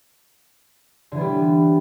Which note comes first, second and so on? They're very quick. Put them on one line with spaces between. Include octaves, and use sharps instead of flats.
D3 E3 B3 G3